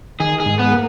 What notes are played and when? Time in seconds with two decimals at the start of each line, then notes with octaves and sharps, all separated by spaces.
0.20 D#3 G#4
0.40 G#4
0.46 G#2
0.59 B3
0.72 A#3